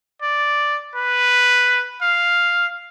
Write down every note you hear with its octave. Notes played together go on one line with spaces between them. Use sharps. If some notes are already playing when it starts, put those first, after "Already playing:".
D5
B4
F5